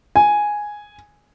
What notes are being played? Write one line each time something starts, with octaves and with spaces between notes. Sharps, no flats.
G#5